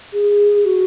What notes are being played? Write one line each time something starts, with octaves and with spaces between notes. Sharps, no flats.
G#4
F#4